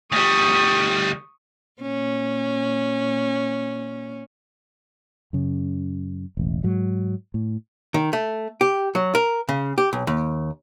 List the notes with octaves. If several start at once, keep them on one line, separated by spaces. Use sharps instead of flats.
D2 G3 C#6 D#6
A#2 C#4
F#2 C#3
E1 A1
G#2 F#3
A2
D#3
A3
G4
F#3
A#4
C#3
G4
B1
D#2